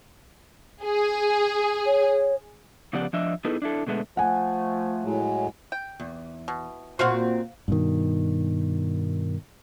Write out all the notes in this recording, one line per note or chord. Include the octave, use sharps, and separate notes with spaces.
G#4
C#5
C#3 F3 B3 G4 D5 F#5
F3 D4 D#5 E5
B3 D#4 E4 G#4 A4 B4
D4 E4 A4
B2 D3 G#3 A3 B3
F3 A3 F#5 G#5
A2 F#3 G#3
G5
E2
B2
A#2 C4 F#4 C5 F5 F#5
G2 B2 D#3